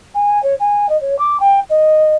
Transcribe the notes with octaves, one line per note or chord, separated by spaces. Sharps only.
G#5
C#5
G#5
D#5
C#5
D6
G5
D#5